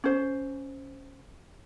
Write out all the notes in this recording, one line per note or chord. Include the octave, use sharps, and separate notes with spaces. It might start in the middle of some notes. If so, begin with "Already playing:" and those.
C#4 C5